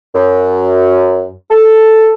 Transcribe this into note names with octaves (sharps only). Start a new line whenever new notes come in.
F#2
A4